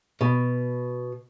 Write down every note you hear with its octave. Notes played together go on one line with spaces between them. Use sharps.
B2